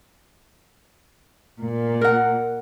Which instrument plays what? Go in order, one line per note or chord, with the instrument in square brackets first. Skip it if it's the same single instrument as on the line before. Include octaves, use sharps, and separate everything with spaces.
[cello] A#2
[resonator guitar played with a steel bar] A#4 F#5